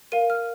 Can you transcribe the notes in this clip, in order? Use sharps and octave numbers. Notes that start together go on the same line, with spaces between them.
A#4 F5 D#7
F6